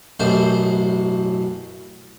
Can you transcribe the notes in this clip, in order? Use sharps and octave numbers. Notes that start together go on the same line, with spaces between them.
A1 F#2 B2 C5